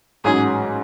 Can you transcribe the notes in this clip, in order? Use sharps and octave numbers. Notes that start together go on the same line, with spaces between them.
A1 G#2 F#3 C#4 G#4